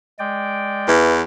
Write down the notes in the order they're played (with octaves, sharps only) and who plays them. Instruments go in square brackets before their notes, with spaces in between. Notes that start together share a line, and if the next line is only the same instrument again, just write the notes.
[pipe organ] G#3 D5 G5
[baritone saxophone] E2 [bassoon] E3